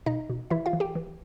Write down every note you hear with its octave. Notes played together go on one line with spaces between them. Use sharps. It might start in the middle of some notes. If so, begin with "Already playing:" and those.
B2 D#4 D#5
B2
E3 E4 E5
F4 F5
E3
G4 G5
E3